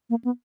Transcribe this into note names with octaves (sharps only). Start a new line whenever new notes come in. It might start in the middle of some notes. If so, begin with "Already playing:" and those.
A#3
B3